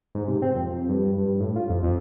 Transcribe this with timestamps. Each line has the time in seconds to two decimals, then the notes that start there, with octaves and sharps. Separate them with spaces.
0.15 G#2
0.28 C3
0.42 C4
0.55 F2
0.72 F2
0.89 G2
1.18 G2
1.40 A2
1.56 F4
1.69 F2
1.83 F2